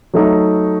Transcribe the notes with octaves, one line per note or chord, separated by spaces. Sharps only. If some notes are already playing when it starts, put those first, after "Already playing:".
F#3 A3 D#4